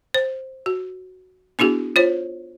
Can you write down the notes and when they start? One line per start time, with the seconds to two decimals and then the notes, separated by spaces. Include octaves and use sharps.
0.14 C5
0.66 F#4
1.59 B3 D4 E4 F#4 G#4
1.96 F4 C5 C#5